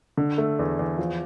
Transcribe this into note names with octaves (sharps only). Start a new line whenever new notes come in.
D3
A3
E2
E2
F3